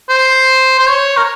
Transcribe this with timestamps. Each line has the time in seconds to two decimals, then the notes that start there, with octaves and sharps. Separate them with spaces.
0.09 C5
0.79 C5
0.88 C#5
1.17 A#4